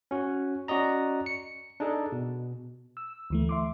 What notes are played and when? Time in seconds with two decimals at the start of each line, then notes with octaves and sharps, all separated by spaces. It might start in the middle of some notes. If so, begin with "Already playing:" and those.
0.11 C#4 F#4
0.68 C#4 F#4 D5 D#5 A#5
1.26 C#7
1.80 D4 D#4 G#4 A4
2.12 B2
2.97 E6
3.30 D2 E3 A3
3.49 E5 C6 D6